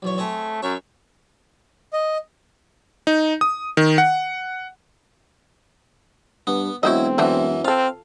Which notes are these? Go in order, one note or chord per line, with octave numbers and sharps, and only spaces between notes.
B1 E2 C#5
A3 C4 G#4 C#5
F#2 C#5 E5
D#5
D#4
D#6
D#3
F#5
G2 B3
E1 F#3 C4 E4 F#4 C5 D#5
F#2 E3 A3 D4 F#4
C4 F4 A4 F5